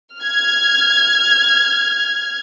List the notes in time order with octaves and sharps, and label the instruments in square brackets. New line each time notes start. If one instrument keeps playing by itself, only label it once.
[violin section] F6 G#6